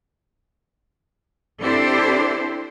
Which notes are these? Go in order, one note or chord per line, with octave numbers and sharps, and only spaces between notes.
C4 D4 E4 G4 A4 C5